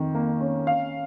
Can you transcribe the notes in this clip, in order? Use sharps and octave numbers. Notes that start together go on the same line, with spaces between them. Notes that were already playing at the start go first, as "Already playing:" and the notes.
Already playing: F2 D#3
A#3
C#4
C#4 F5